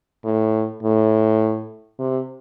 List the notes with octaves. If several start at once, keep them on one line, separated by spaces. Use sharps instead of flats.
A2
A2
C3